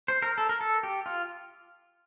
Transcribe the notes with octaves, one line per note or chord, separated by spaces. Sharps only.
C5
A#4
A4
A#4
A4
G4
F4